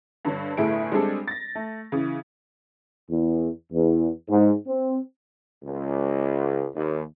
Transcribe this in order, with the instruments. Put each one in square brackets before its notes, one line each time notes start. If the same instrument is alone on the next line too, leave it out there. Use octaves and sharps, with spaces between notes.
[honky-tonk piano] G2 D3 C#5
G1 A2 A3 E4 G#4 D7
G3 G#3 C4 D4 G#4 A4
A6 A#6
A3
C#3 E3
[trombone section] E2
E2
G#2
C4
C#2
D#2